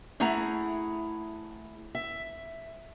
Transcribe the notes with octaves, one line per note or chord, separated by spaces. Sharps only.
A3 E4 G#4 F#5 A#5
E5